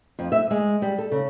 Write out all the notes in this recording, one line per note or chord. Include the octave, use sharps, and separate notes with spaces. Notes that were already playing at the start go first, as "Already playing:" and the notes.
F2
E5
G#3
G3
A4
C#3